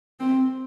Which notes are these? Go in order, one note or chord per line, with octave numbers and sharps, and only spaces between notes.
C4